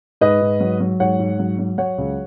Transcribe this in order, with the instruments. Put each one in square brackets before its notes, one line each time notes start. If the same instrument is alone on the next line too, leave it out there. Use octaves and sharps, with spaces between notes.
[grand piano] G#2 B4 D#5
G#2
F#3
F#3
G#2 C#5 F#5
G#2
F#3
F#3
F#3 C#5 F#5
C#2